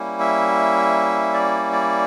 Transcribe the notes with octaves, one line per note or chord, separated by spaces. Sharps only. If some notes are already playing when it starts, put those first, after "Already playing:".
Already playing: G3 A#3 C#4 E4
E5
D5
D5